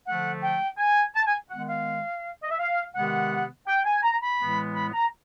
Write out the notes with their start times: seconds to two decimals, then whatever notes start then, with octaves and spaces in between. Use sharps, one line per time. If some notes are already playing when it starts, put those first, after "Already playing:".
0.06 D3 F3 A3 F#5
0.42 G5
0.78 G#5
1.15 A5
1.27 G#5
1.50 D#3 G#3 B3 F#5
1.69 F5
2.43 D#5
2.51 E5
2.59 F5
2.95 C3 D#3 G#3 B3 F#5
3.67 G5
3.85 G#5
4.03 A#5
4.20 B5
4.39 A2 E3 G#3 B3
4.74 B5
4.93 A#5